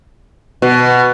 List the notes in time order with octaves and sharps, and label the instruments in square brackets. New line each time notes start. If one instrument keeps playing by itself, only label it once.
[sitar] B2